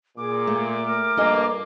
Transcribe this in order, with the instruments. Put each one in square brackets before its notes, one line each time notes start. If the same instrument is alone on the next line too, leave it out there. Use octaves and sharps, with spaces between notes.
[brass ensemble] A#2 [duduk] G#4 [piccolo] D6
[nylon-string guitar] A3
[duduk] A#4
[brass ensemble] G2 F3 A#3 [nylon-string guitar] A4 D#5 G#5